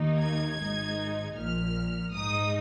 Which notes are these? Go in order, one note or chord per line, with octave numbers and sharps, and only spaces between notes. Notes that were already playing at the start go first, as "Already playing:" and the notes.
Already playing: D#2 D#3 A#3 D#4
G#6
G#1 G#2 G#3 D#4
A#1 A#2 F3 F6
G#2 G#3 D#4 D#6